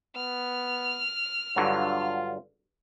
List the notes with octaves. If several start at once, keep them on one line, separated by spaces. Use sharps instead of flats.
B3 F6
G2 D3 F#3 F4